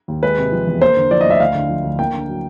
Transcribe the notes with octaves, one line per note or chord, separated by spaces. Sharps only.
D#2
G#3 B4
C3
F3
E2
A#3 C5
D3
F3 D5
D#5
D2 E5
D2 F5
D3
F3
D2
A#3 G5
D3
F#3